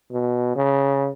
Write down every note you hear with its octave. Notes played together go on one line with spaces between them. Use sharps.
B2
C#3